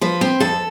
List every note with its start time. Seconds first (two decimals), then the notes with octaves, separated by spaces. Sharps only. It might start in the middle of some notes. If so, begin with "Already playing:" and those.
0.01 F3 B4
0.21 C4
0.40 F2 A4